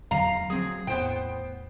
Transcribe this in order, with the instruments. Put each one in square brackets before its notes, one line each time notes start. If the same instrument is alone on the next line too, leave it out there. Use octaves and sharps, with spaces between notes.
[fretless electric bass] E2 D3 F#3 [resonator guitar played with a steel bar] F5 A#5
[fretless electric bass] F#3 C4 [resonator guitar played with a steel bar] G#4
[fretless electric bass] E2 A2 [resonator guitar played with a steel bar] B3 C5 G5